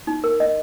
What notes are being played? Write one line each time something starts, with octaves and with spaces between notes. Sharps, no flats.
D#4
A#4
D#5